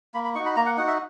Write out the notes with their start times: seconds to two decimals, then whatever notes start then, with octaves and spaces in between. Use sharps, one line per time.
0.14 A#3 B5
0.25 B5
0.35 D#4 C#6
0.39 F#4
0.46 B5
0.56 A#3 A#5
0.66 F#5
0.77 D#4 F#4 F#5
0.87 E5